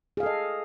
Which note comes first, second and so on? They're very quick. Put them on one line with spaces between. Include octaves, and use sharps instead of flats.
G#4 F5 A4 D#5